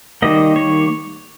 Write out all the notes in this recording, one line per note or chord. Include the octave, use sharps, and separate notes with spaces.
D#3 G3 A#3 D#5
C#5